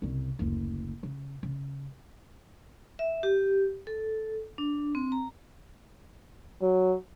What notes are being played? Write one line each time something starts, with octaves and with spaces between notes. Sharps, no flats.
C2 C#3
F#1 D2
C#3
C#3
E5
G4
A4
D4
C4
A#5
F#3